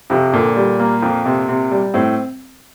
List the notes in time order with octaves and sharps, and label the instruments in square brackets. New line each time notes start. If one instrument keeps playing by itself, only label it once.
[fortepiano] F2 [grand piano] C3
[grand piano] A#2 [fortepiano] D3
[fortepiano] G3
A#3
F2
C3
C3
G3
[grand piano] A2 [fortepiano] C4